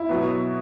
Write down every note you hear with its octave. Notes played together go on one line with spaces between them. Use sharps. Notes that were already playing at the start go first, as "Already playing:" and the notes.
Already playing: E4
B2 F#3 B3